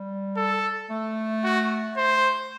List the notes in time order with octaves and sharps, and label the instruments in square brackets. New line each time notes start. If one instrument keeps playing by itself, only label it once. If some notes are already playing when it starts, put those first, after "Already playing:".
Already playing: [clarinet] G3
[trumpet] A4
[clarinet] A3
[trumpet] F#4
C5